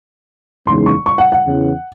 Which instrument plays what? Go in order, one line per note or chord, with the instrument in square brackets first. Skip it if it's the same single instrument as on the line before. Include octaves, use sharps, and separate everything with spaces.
[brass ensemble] F#1 E2 C#3 G#3 D#4 [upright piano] C6
[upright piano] C#6
C#6
F#5
F#5
[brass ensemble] E2 C#3 E3